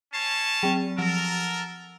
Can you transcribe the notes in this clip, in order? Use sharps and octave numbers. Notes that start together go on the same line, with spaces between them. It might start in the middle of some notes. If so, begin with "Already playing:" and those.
C#4 C#5 A5 C7
F#3 C4
F3 A4 A#4 A6